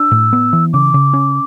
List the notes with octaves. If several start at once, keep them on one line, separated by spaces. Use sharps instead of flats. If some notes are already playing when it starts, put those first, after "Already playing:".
Already playing: D4 E6
A2
B3
E3
C#3 D6
C#3
C#4